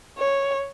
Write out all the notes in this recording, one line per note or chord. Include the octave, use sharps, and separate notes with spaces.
C#5